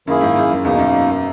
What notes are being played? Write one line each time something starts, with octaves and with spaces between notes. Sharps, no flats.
F#2 D#3 A#3 E4 G#4
G#2
F#2
E2 B2 A#3 D#4
F#2